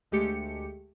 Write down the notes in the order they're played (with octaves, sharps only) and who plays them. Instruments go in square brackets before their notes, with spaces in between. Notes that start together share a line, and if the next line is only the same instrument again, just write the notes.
[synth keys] D2 G#3 A3 G4 C#7